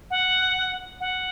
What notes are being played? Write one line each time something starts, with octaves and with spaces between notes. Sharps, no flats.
F#5
F#5